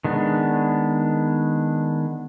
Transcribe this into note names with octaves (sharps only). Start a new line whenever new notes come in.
D#3 G#3 B3 D4